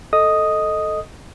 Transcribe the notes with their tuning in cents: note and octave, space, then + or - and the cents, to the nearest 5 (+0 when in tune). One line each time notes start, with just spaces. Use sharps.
A4 +0 D#5 +0 D#6 +0